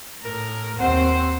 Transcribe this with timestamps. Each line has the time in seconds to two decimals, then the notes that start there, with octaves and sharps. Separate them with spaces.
0.22 A2 A#4
0.78 D#2 C4 C5 F#5